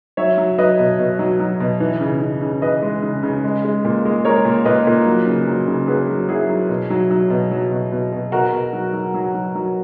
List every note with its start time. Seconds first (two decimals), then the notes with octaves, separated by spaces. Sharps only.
0.17 F#3 C#5 E5
0.38 F#3
0.58 F#3 B4 D#5
0.79 B2
0.99 B2
1.19 F#3
1.40 F#3
1.60 B2
1.80 E3
2.01 C#3
2.21 C#3
2.41 C#3
2.61 E3 B4 D#5
2.82 G#3
3.02 C#3
3.23 C#3
3.44 G#3
3.64 G#3
3.85 A#2
4.05 G#3
4.25 G#3 A#4 C#5
4.45 A#2
4.65 A#2 B4 D#5
4.87 A#2
5.07 F#3
5.27 C#3
5.47 F#3
5.67 C#3
5.88 F#3 G#4 B4
6.09 F#3
6.29 F#3 E4 G#4
6.49 F#3
6.69 B2
6.90 F#3
7.10 F#3
7.30 B2
7.51 F#3
7.71 B2
7.92 B2
8.12 B2
8.32 B2 F#4 A#4
8.53 B2
8.73 F#3
8.93 F#3
9.14 F#3
9.35 F#3
9.55 F#3